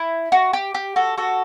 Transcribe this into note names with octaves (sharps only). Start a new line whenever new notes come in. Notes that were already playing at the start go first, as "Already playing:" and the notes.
Already playing: E4
F#4
G4
G4
F#4 A4
F#4 A4